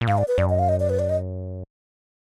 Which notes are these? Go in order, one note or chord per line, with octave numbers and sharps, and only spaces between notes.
A#2
G#2 F5
D5
B4
F#2 D5
D#5
F5
D#5
D5
B4
D5
D#5